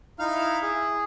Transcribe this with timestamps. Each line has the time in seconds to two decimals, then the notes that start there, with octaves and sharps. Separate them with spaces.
0.19 D#4 E4 F5 F6
0.63 G#4